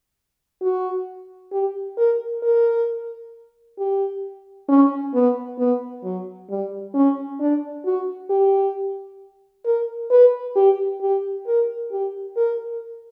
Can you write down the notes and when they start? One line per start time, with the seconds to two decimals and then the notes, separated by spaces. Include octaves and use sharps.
0.62 F#4
1.52 G4
1.97 A#4
2.43 A#4
3.78 G4
4.69 C#4
5.14 B3
5.59 B3
6.04 F#3
6.50 G3
6.95 C#4
7.40 D4
7.85 F#4
8.30 G4
9.65 A#4
10.11 B4
10.56 G4
11.01 G4
11.47 A#4
11.92 G4
12.37 A#4